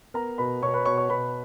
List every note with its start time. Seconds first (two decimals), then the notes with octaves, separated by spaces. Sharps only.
0.14 B3 A#4 A#5
0.38 B2 B4 B5
0.62 B2 C#5 C#6
0.74 B4 B5
0.86 B2 C#5 C#6
0.97 C#5 C#6
1.09 B2 B4 B5